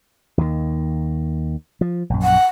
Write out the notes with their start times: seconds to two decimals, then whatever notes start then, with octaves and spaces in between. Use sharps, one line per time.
0.38 D#2 D#3
1.81 F3
2.10 A#1 F#2
2.23 F#5